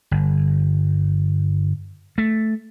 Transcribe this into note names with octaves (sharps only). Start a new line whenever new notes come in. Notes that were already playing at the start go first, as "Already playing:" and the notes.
G1
A3